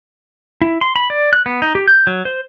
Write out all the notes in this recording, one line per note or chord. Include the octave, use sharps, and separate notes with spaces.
E4
C6
B5
D5
F#6
B3
D#4
G4
G6
F#3
C5